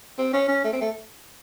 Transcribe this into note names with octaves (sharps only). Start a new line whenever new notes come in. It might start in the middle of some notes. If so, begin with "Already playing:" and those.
C4
C#4
C#4
A3
C4
A3